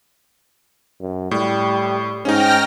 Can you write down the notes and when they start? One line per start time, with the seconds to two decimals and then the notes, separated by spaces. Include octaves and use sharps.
1.01 F#2
1.31 A2 G3
2.25 G#2 C#4 D#4 G5 F6 A#6